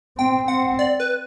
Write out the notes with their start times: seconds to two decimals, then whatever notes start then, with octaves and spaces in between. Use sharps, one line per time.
0.17 C4 G5
0.48 C4 F#5
0.79 D5
1.00 B4